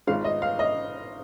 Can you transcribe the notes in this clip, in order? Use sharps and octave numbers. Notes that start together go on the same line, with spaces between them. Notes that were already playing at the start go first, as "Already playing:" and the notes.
G#1 G#2 G#3 F4 F5
D#5
F5
D#5